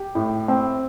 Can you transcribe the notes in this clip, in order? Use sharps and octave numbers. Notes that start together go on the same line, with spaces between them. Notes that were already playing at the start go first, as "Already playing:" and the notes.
Already playing: G4
A2
C4